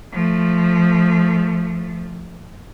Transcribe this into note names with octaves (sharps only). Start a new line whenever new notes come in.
F3 A3